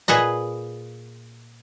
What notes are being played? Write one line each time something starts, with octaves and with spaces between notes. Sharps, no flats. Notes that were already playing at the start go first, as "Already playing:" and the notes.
A#2 G#4 B4 D#5